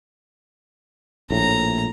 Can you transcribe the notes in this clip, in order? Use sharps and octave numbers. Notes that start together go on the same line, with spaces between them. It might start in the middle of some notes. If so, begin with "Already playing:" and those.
A#1 A2 A#5